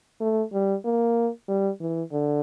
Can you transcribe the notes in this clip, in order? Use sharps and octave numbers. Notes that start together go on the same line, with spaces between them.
A3
G3
A#3
G3
E3
D3